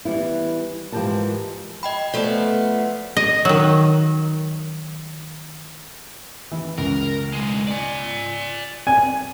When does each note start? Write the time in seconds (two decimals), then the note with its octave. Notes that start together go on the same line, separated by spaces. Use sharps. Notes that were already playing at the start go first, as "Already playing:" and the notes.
0.05 E3 G3 B3 E4
0.92 G#2 E3 F3 G4 A#4 A5
1.83 D#5 G5 B5
2.14 F3 A3 B3 D5
3.17 D#5
3.45 D#3 F#3
6.52 E3
6.78 C#2 A#4
7.33 B1 G#3
7.67 D5 G#5
8.87 G#5